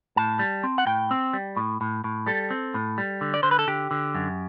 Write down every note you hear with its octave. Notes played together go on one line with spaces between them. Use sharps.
A2 A5
G3
C4
F#5
A2 G5
C4
G3
A2
A2
A2
G3 A4
C4
A2
G3
D3
D5
D3 C5
B4
A4
D3 G4
D3
F#2